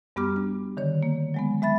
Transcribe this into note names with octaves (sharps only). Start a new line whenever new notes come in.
F#2 G3 B3 G4 D6 F6
D4
D3 D#3 C#5
A#3
F#3 G#3 B3
G#3 E5 B5 A6